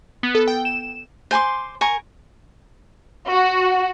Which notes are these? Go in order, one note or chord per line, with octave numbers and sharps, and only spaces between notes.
B3
A4
G5
E7
C5 G#5 C6 D6
A#4 G#5 C#6
F#4